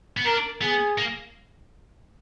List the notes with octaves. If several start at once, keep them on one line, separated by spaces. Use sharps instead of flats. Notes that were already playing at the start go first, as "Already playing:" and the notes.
B3
D4 A#4
B3 G#4
A#3